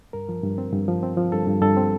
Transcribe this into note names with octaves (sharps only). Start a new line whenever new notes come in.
G2 A#4
F3
G2
C4
G2
F3
C4
F3
G2 A4
G2
G2 A4
C4